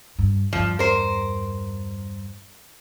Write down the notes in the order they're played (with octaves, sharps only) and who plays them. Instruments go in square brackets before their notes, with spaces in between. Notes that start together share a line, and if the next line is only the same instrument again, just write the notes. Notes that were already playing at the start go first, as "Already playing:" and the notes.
[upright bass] G2
[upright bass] E2 G2 [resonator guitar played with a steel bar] F3
[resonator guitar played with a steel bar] A#4 C5